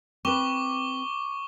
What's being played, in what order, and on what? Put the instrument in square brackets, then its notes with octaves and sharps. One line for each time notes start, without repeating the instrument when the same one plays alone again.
[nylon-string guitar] C4 B4 [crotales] C#6 D6 G7